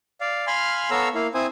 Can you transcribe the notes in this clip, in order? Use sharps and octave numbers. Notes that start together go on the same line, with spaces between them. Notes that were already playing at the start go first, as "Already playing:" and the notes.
D5 F5
F5 G#5 B5 C6 F6
B3 A4 C#5 F5 A#5 E6
A#3 E4 F5
C4 E4 C5 G#5 D#6